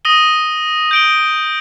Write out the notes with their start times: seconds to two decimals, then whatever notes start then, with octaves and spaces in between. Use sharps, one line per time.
0.05 D#6 A#6 D#7 G7
0.91 G6 D7 G7